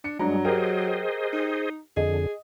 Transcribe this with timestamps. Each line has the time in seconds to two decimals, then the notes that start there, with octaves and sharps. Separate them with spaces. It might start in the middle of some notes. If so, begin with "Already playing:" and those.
0.04 D4 C#7
0.19 G2 F#3 G#3 D4 A#5
0.45 G4 G#4 A#4 C5 D#5
1.33 D#4
1.97 F2 D3 G#4 D#5